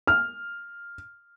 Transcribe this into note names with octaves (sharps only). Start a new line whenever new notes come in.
F6